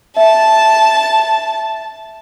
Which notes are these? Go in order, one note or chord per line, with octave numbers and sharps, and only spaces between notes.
E5 A5